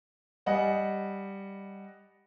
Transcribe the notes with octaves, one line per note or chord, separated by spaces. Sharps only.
G3 D#5 F#5 G#5